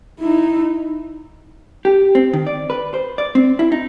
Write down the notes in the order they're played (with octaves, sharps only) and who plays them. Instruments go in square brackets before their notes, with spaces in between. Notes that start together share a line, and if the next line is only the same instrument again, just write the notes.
[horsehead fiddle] D#4 E4
[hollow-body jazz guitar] G4
C4
D#3
D5
B4
C5
D5
C4
E4
D#4